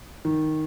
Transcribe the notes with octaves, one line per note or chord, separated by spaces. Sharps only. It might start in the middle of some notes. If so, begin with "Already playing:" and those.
D#3